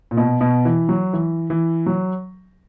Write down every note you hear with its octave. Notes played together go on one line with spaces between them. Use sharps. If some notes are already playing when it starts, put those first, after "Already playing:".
A#2
B2
B2
E3
F#3
E3
E3
F#3